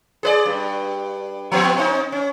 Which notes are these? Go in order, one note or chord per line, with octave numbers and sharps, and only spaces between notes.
G#4 B4 D5
G2
F3 B3 C4
C4 D#4
C#4